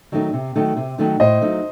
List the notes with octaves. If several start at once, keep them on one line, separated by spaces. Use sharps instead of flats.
D#3 F#3 A3 D#4
C3
D#3 F#3 A3 D#4
C3
D#3 F#3 A3 D#4
A2 C5 D#5
F#3 A3 D#4